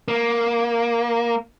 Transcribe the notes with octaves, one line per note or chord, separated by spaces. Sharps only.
A#3